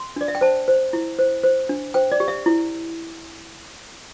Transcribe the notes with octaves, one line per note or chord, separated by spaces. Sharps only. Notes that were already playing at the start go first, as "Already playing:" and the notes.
Already playing: C6
D4 D5
E5
G5
C5 A5
C5
E4
C5
C5
D4
C5 G5
D5
G4
E5
E4